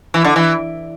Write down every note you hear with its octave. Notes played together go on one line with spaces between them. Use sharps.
E3
D3
E3